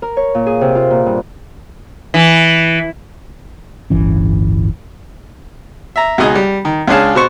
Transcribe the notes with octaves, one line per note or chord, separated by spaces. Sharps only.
A#4
C#5
A#2
G#4
C3
F4
A#2
G2
E3
D1 G1 E3 C#4
E5 A#5
C#2 B2 D#4 G#4 D#5 D#6
G3
D#3
C#2 C#4 D4 G#4 F5 A5
B2 C5 C#6